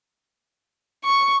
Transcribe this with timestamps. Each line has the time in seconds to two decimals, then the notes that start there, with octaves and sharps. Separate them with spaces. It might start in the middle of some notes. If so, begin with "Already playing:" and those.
1.05 C#6